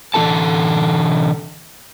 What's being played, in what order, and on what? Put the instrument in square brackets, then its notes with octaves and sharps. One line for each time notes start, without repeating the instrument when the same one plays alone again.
[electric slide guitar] D3 E3 D#4 A4 A5